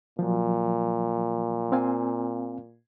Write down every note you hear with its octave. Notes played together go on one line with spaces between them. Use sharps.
A#2 F3 F#3
C4 F5 G#5